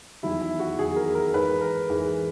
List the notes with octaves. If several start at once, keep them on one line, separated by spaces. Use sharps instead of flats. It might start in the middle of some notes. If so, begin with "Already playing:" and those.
E2 D#3 F#3 E4
E4
F#4
E2 D#3 F#3 G#4
A#4
A#4
G#2 E3 G#3 B4
A#4
G#2 E3 G#3